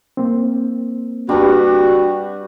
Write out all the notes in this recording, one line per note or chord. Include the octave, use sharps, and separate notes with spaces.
A#3 C4
G3 D4 F#4 G4 B4